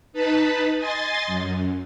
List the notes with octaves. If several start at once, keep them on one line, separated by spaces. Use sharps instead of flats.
D#4 B4 A5 B5
D#5 G#5 C6 A6
F#2